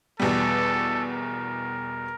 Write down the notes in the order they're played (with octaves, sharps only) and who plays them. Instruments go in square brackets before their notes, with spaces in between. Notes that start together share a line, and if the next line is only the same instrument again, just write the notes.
[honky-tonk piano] E2 B2 G3 [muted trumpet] A4
[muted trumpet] A#4